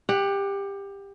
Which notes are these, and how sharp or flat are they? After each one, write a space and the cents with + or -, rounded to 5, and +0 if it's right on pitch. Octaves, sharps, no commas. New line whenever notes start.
G4 +20 F#5 +0